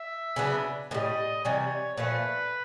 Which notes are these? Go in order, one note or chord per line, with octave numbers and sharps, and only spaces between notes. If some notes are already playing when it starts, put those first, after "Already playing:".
Already playing: E5
C#3 F#3 B3 D4
A2 E3 G3 D#5
C3 E3 G3 C#5
A#2 F3 A3 B4